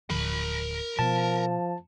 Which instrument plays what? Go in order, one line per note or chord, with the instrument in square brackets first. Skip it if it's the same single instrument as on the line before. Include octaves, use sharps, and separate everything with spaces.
[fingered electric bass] D1 D3 F3 [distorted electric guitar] A#4 B5
[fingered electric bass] B2 B3 [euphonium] F3 [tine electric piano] A5